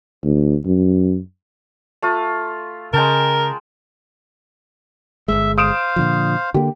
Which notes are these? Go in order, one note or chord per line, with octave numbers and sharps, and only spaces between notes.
D2
F#2
A3 F4
C#3 G#3 A#4 G5 A5
G1 C#2 G#3 E5
C5 F5 D#6 D7 E7
A#2 D3 F3
D3 A#3 G4